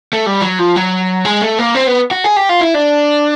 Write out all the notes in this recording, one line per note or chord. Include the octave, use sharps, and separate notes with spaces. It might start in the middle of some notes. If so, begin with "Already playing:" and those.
A3
G3
F#3
F3
F#3
G#3
A3
A#3
C4
B3
F#4
G#4
G4
F4
E4
D4